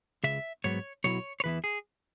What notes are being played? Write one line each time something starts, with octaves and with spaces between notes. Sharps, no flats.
C#2 C#3 E5
G#2 F#3 B3 C#5
B1 B2 F#3 E4 C#5
C#5
E2 E3 B3 E4 B4
G#4